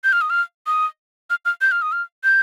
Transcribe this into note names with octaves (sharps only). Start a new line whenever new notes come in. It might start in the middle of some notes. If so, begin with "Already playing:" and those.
G6
F6
D#6
F6
D#6
F6
F6
G6
F6
D#6
F6
G6